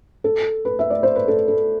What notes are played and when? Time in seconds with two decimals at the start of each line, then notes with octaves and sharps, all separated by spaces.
0.24 A4
0.65 B4
0.79 E5
0.90 D5
1.03 C5
1.16 B4
1.28 A4
1.48 A4